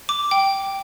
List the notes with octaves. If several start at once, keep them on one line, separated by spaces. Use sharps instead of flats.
D6
G5